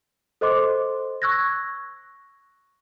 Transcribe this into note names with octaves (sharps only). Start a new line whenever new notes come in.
A4 C5 D#5 C6 D6
C#6 E6 F#6 G#6 A#6